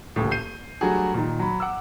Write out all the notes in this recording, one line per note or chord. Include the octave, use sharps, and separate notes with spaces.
D#1 C#2 A2
G6 C7 D#7
F#3 G3 A3 D4 F#4 G#4
A#2 D#3
F#3 B5
F#5 D6 E6